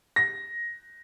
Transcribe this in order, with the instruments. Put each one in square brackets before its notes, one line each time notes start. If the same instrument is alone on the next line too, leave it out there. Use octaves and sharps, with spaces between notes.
[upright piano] A#6